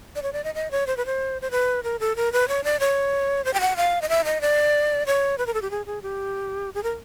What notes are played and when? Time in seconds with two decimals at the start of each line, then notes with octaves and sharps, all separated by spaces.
0.16 D5
0.23 C#5
0.33 D5
0.44 D#5
0.55 D#5
0.71 C#5
0.87 C5
0.97 B4
1.06 C5
1.42 C5
1.51 B4
1.83 A#4
2.00 A4
2.16 A#4
2.33 B4
2.48 C#5
2.64 D5
2.80 C#5
3.45 C5
3.54 G5
3.61 F#5
3.77 F5
4.02 D#5
4.09 E5
4.25 D#5
4.41 D5
5.06 C#5
5.38 B4
5.46 A#4
5.54 A4
5.62 G4
5.71 G#4
5.86 G#4
6.02 G4
6.75 G#4
6.83 A#4